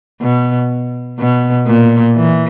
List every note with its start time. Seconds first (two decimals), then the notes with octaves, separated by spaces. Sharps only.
0.22 B2
1.20 B2
1.67 A#2
2.16 E3